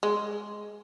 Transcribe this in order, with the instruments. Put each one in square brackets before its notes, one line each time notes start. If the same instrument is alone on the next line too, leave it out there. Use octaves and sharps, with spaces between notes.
[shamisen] G#3